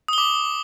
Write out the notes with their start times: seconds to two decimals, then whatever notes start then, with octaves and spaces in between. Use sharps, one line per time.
0.08 D#6
0.13 G7
0.18 D6